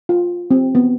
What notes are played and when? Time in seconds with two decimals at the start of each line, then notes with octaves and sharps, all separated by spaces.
0.09 F4
0.51 C4
0.75 B3